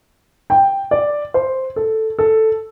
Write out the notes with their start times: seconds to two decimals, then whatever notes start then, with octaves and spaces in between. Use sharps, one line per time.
0.50 G5
0.91 D5
1.34 C5
1.76 A4
2.19 A4